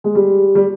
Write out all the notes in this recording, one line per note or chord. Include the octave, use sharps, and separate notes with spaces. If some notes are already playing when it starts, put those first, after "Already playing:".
G#3
G3
G3